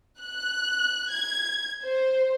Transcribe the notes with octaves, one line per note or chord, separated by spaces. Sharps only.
F#6
G#6
C5